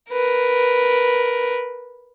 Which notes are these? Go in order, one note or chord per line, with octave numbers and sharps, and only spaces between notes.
A#4 B4